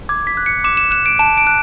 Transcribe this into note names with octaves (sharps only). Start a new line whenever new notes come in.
D6 G#6
B6
F#6
C#7
D6 E7
E7
F#6 E7
D7
A5 E7
D7
F#6